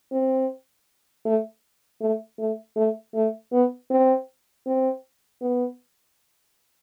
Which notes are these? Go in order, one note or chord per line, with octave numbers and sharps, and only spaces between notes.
C4
A3
A3
A3
A3
A3
B3
C4
C4
B3